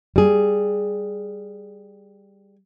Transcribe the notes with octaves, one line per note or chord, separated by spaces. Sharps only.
G3 G#4